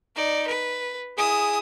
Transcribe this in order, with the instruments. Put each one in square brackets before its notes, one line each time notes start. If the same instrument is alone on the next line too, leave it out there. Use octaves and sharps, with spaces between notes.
[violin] D#4 D5
B4
[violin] E4 D#6 [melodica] G#4